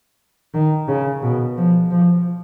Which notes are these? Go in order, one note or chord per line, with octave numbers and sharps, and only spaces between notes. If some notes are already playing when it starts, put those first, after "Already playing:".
D#3
C#3
B2
F3
F3